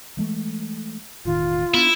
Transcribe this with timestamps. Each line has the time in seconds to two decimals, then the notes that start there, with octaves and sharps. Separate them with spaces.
0.17 E3 G#3 A3
1.25 E1 A2 D#3 F4
1.74 B3 D4 E4